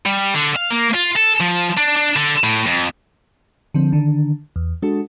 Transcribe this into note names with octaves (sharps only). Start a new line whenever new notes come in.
G3
D3
F5
A#3
F4
A4
F3
D4
D4
D3
A2
F2
D3 F3 C4
D3 D#3 D4
E2
G#3 D4 F#4 A4